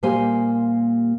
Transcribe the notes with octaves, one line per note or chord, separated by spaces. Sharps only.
A#2 G3 A#3 G4 C5 G#5